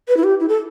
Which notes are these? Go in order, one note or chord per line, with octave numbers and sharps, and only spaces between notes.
B4
E4
G4
E4
A4